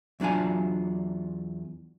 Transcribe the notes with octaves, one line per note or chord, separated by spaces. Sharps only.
E2 F#3 D4 F4 G#5